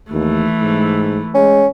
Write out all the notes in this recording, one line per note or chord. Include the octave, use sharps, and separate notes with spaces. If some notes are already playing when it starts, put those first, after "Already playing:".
D#2 E3 A3
G#2
G#3 C#4